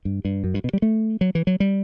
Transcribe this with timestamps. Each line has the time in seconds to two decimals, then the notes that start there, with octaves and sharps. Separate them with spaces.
0.05 G2
0.25 G2
0.44 F#2
0.54 G2
0.64 B2
0.73 G3
0.82 A3
1.21 F#3
1.35 E3
1.47 F#3
1.60 G3